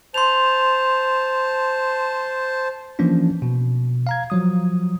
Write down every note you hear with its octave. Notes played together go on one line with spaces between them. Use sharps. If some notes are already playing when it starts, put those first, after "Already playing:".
C5 A5 C6 F7
E3 F3 A#3 C#4 D4
B2
F5 A#5 G#6
F3 F#3 D#6